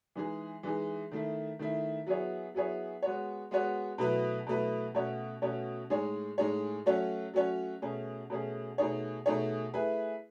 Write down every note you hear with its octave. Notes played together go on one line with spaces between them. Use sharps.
E3 G#3 D#4 G#4
E3 G#3 D#4 G#4
D#3 A3 E4
D#3 A3 E4
F#3 B3 E4 G#4 C#5
F#3 B3 E4 G#4 C#5
G#3 B3 F#4 C#5
G#3 B3 F#4 C#5
B2 F#3 A3 E4 B4
B2 F#3 A3 E4 B4
B2 A3 C#4 F#4 C#5
B2 A3 C#4 F#4 C#5
A2 G#3 D#4 G#4 C#5
A2 G#3 D#4 G#4 C#5
F#3 A3 C#4 F#4 C#5
F#3 A3 C#4 F#4 C#5
B2 A3 C#4 G#4
B2 A3 C#4 G#4
B2 A3 D#4 G#4 C#5
B2 A3 D#4 G#4 C#5
A3 E4 G#4 B4